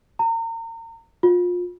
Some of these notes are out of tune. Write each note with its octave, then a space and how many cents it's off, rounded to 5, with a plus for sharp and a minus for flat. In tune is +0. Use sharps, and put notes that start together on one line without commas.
A#5 -35
F4 +30